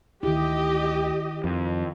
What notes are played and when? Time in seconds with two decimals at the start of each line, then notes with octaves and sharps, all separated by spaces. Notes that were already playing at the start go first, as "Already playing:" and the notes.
0.23 D2 D#3 E4 G4 D#5
1.44 F2 D#3